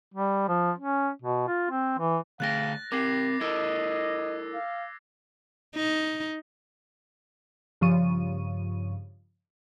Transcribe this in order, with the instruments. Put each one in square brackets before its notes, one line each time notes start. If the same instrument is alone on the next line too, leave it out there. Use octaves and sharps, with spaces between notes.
[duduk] G3
F3
C#4
B2
F4
C4
E3
[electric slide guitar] D3 A3 G5 [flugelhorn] F5 [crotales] F#6 A6 A#6
[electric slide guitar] C4 A#4 [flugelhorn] G4 [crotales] D6 G#6 C7
[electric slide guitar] E4 A4 A#4 [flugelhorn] D#5 [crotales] E6 G#6
[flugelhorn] F5
[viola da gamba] D#4
[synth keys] G2 C#3 F3 C#6 D#7